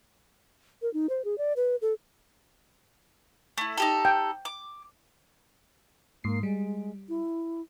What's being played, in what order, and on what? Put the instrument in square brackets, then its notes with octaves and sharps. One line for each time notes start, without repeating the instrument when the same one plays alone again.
[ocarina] A#4
D#4
C5
G#4
D5
B4
A4
[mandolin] A3 E4
D#4 G4 A4
[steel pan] G5
[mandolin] D6
[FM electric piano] G#2 C7 [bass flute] A#3
[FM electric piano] G3 [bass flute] G#3
[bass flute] E4